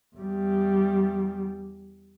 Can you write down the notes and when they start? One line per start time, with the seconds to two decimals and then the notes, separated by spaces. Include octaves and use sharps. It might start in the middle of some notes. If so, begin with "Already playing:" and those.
0.17 E2 G3